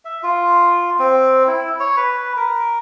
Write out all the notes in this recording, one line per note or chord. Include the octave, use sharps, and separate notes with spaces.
E5
F4
C4
E4
C#5
B4
A#4